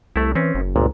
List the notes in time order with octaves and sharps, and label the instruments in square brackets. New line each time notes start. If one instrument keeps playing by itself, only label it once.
[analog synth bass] C2 [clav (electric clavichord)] A3 E4
[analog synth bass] E3 [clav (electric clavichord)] C4 C#4
[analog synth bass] F#1
[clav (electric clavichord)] G1 A#2 [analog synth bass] C#2